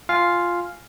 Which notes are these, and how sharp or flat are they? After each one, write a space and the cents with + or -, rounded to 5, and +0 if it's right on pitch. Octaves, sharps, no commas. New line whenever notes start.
F4 +0 F5 +0 G#5 +0